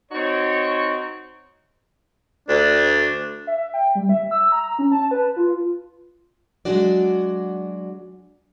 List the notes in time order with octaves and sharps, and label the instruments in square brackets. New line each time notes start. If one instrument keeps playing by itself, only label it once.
[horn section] C4 D#4 F#4 C#5
[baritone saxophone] D2 [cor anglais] D4
[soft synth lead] E5
G5
G3
E5
E6
A#5
C#4
A5
B4
F4
[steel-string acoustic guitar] F#3 G#3 D4 F#4 D5